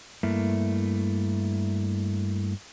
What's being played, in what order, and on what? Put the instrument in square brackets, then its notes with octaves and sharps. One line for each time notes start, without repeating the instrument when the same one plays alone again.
[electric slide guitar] G2 A3 A#3 E4